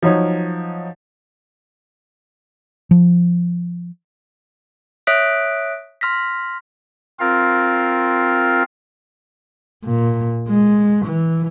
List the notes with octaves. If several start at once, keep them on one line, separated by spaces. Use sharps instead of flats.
F3 F#3 D#4 C#5
F3
C#5 E5 D#6 F#6 B6 D7
C6 F6 A#6 B6
C4 F4 A#4 F5
A#2
G#3
E3